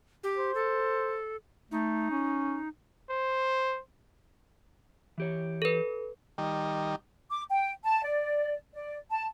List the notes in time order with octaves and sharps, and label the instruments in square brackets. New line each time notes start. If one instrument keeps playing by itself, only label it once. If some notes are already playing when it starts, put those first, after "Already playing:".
[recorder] G4
[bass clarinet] C5
[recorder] A4
[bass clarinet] A3 [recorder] D#4
[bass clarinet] C#4
[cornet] C5
[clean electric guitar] E3 G4 C#5
[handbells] A4 B4
[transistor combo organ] D#3 G3
[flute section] D6
G5
A5
D5
D5
A5